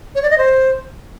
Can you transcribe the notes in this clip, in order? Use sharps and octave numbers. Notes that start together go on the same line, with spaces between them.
C#5
D5
D#5
C5